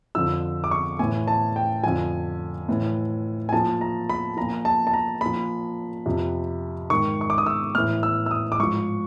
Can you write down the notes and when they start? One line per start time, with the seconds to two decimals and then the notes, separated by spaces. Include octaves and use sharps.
0.15 F2 D3 F3 E6
0.64 D6
0.71 C#6
0.99 A2 E3 G#5
1.28 A5
1.56 G5
1.83 F2 D3 F3 G#5
2.69 A2 E3
3.49 G#5
3.53 A#2 F3 A5
3.81 A#5
4.09 B5
4.37 A#2 F3 A#5
4.65 A5
4.87 A5
4.93 A#5
5.21 A#2 F3 B5
6.06 F2 C3 F3
6.90 G#2 D#3 C#6
7.21 C#6
7.30 D6
7.38 D#6
7.46 E6
7.75 A2 E3 F6
8.03 E6
8.26 E6
8.31 D#6
8.52 D6
8.60 G#2 F3 C#6